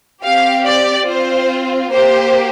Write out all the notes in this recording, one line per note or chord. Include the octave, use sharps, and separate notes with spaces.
C4 G4 F5
D5
C4 F4 C5
A#3 G4 C5